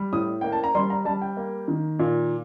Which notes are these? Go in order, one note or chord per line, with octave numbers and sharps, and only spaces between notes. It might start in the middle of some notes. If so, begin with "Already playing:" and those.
Already playing: G3
A2 D#6
A#3 G5
A5
A#5
G3 C6
A#5
G3 A5
G5
A#3
D#3
A#2